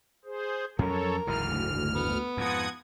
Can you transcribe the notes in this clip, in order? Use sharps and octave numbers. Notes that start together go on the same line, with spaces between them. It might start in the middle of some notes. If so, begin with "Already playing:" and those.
G#4 C5
F2 F#3 C#4 A4 A#4 C#5
F#1 D2 G#2 E3 F6
B3
F2 G#2 F#5 D#6 G#6